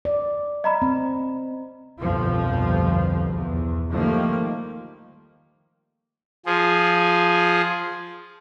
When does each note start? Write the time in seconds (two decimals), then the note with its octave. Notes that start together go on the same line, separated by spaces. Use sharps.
0.05 D5
0.64 D#5 A#5 B5
0.82 C4
1.99 G1 C2 F2 B2 F3
3.32 E2
3.91 D#3 F3 G3 A3 A#3
6.46 F3 G#4